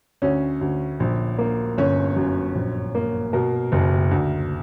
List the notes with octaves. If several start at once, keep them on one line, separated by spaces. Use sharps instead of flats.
D2 C#4 C#5
D2
A#1
A#3
G1 C#4 C#5
F#2
A#1
A#3
B2 A#4
F#1
D2